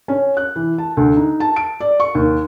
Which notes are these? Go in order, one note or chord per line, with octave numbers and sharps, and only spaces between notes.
C#4
F#6
E3
A5
D2
D#4
A5
D7
D5
C#6
D#2